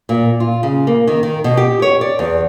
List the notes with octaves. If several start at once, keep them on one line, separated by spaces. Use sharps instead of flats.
A#2
F4
C#3
A#3
D#3
D#3
B2
G4
C#5
D5
E2